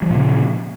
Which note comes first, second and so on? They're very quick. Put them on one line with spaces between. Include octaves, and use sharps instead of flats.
F#3 F3 A#2 C#3